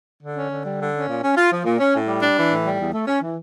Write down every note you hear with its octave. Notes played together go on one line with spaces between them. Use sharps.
D3
C#4
D3
G3
D3
C#4
A#2
C#4
F4
F3
A#2
C#4
A2
G3
D4
E3
A2
G3
E2
A3
C#4
E3